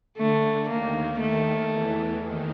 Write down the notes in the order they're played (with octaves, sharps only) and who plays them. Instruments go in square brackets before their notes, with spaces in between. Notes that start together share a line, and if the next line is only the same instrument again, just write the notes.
[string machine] D3 [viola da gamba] A3
[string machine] D#2 D#3 [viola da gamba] A#3
[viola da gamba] A3
[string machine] E2 E3
D#2 D#3